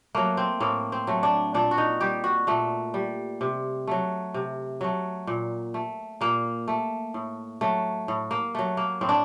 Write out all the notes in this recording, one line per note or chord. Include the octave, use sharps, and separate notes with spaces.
F#3 A3 A#3
C4
A2 A#3
C4
F#3 A3
D4
A#2 D4
F#4
D#4
G3 G4
F#4
A#2 A3
G3
C3
F#3 A3
C3
F#3 A3
A#2
A3
A#2 A#3
A3
A2
F#3 A3
A2
A#3
F#3 A3
A#3
A2 C4
D4